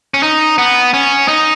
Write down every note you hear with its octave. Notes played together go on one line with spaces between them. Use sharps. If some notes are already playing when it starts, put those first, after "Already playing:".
C#4
D#4
B3
C#4
D#4